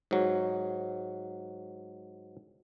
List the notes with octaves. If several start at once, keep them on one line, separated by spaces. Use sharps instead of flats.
G#2 F#3